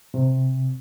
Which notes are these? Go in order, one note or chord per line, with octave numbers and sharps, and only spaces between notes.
C3